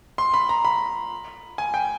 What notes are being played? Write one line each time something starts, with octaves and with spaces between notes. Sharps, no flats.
C6
B5
A#5
B5
G#5
G5